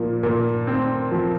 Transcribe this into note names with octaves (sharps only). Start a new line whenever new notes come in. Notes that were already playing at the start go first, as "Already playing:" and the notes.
Already playing: A#2 F3
A#2
C4
F3